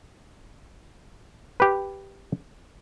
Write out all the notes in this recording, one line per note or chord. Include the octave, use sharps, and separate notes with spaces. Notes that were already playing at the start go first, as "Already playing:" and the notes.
G4 B4